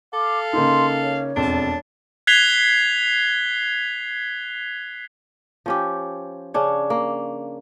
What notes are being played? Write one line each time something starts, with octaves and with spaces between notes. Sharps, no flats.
A4 F5 D6
C#3 A#3 D#4 C6
C#5
E1 F2 D4 A5
F#6 G#6 B6 C7 F7 G7
F3 C#4 G4
C#3 C#4 D4 C#5
A#3